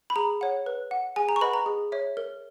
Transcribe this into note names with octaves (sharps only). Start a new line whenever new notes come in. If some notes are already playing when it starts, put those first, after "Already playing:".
B5
G#4 A#5
C#5 F#5
B4
F#5
G#4 G#5
A#5
C#6
B4 D#5 F#5 B5
A#5
G#4
C#5 E5
A#4